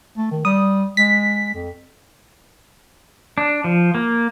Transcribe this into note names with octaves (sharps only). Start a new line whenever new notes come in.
A3
D#3
G3 D#6
G#3 B6
F2
D4
F3
A#3